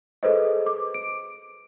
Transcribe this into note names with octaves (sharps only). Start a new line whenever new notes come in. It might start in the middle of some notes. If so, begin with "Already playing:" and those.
G#4 A4 B4 C5 D#5
D6
D7